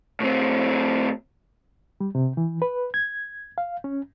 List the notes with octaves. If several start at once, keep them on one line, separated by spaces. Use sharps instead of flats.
A2 C4
G3
C3
E3
B4
G#6
F5
C#4